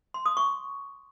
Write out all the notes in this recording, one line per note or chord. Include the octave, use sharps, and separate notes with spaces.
C6
D#6
C#6